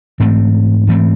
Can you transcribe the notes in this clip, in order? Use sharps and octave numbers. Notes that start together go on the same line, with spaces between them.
G#2 E3 A3 C4
G#2 E3 A3 C4